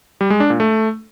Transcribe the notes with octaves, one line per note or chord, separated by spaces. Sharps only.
G3
G#3
D4
A#2
A3